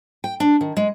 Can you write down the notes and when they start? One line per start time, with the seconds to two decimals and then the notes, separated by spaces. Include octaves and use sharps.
0.24 G5
0.40 D4
0.61 D#3
0.77 G#3